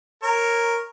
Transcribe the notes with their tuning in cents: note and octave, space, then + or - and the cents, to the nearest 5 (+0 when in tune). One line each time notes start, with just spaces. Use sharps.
A#4 +0 C#5 -10